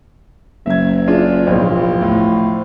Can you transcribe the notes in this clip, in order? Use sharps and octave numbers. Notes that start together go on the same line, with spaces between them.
F#1 E5 G#6
D4 F4 G#4
D1 B1 F3
A2